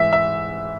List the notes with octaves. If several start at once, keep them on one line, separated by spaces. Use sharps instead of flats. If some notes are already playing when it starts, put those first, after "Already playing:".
Already playing: G#2 E3 E5
E5